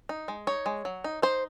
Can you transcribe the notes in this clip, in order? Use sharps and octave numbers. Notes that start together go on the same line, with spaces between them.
D#4
G#3
D#4 C#5
G#3
F#3
D#4
D#4 C5